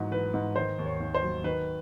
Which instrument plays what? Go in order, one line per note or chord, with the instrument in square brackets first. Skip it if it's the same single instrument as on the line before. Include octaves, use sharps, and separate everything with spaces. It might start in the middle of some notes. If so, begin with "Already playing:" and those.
Already playing: [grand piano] G#2 E3 F#3
E3 B4
G#2
D#3 C5
D#2
C#5
D#2
C5
F#3
D#3 B4